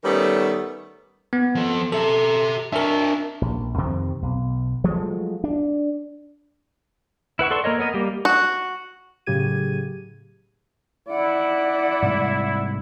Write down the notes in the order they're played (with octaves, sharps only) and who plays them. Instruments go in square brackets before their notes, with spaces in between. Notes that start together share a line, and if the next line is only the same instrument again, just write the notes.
[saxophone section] D#3 G3 A3 B3 C#4
[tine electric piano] B3
[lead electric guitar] F3 A4
[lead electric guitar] G4 E5 [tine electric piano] A4
[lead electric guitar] D4 C#5 [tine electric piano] A#4 E5
[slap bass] A#1
F2 C3 D#3 C4
B1
F3 F#3 G#3 A3
D4
[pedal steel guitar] E4 B4 F#5 C#6
A4 B4 D5 C6 C#6
A#3 A#4 C#5 D#5
B3 A#4 D#5
G3 A#3 G4
[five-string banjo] F#4
[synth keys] A2 C#3 F#3 G4 G#6 D#7
[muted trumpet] E4 [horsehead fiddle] D5 F#5
[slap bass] G#2 C3 G3